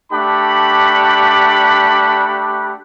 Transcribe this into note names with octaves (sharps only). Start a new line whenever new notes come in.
A3 D4 G4 F#5 B5